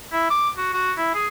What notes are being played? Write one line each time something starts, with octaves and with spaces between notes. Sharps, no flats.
E4
D6
F#4
F#4
E4
G#4